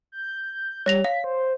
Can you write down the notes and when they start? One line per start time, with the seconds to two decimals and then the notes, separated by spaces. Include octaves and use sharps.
0.12 G6
0.86 G3 C#5 A#6 F7
1.04 F5 B6
1.24 C5